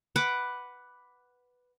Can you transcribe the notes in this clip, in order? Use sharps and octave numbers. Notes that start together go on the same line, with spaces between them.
B4 F#5 D6